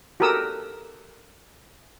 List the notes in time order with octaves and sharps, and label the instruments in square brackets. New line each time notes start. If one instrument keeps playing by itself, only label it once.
[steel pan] F#4 G4 A4 A#4 D#6 E6